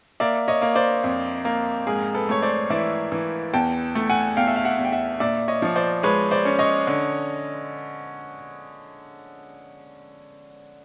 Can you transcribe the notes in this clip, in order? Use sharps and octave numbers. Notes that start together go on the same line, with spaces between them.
A#3 D5 E5
C#5 D#5
A#3
C5 D5
F2
A#3
G#2 G#4 A#4
A4 B4
A3 C#5
C5 D5
E3 D5 E5
E3
E2 G5 A5
A3
F#5 G#5
E2 F5 G5
E5
F5
E5 F#5
E2
G5
E5 F#5
A#2 D5 E5
C#5 D#5
F3 C#5
C5 D5
G#3 B4 C#5
C5 D5
C#4
C#5 D#5
D3